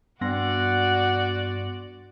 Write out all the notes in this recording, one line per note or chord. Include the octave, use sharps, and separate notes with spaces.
G2 B3 F#4 D5 F#5 C6 A#6